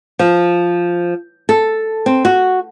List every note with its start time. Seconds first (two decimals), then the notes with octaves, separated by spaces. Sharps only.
0.19 F3
1.49 A4
2.06 C4
2.25 F#4